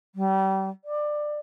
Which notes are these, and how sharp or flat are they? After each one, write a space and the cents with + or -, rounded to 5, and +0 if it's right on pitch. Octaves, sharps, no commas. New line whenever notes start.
G3 -30
D5 +20